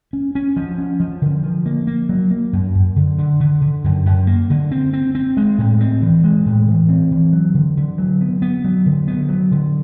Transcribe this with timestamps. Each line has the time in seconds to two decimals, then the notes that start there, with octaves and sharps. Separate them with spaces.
0.13 C#4
0.35 C#4
0.56 F3
0.78 C#4
1.00 F3
1.22 D3
1.43 F3
1.66 A#3
1.87 A#3
2.09 F#3
2.31 A#3
2.53 F#2
2.75 F#2
2.96 D3
3.18 D3
3.40 D3
3.61 D3
3.84 F#2
4.06 F#2
4.27 A#3
4.50 D3
4.71 C4
4.93 C4
5.15 C4
5.37 G#3
5.58 A2
5.81 C4
6.02 E3
6.24 G#3
6.46 A2
6.67 E3
6.89 C4
7.11 E3
7.33 F#3
7.54 D3
7.77 D3
7.98 F#3
8.21 B3
8.42 B3
8.64 F#3
8.86 D3
9.08 B3
9.29 F#3
9.51 D3